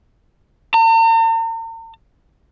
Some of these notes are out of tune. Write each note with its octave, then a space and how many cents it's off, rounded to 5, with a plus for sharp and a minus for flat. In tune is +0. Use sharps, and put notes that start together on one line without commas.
A#5 -45